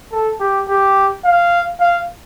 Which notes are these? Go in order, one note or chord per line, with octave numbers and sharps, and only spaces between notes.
A4
G4
G4
F5
F5